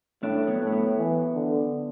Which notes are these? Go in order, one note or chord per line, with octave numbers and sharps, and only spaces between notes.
A2 A3 D4
F#3 B3
A2
A3
F#3 B3
E3
D3